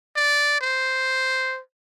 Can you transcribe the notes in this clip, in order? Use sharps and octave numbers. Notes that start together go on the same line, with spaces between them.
D5
C5